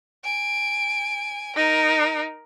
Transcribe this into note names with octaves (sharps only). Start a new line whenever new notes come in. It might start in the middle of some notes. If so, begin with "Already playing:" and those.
G#5 D7
D#4 A#4